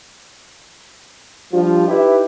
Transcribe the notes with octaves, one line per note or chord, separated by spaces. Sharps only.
F3 G3 D4 F4
D#4 E4 G4 B4 E5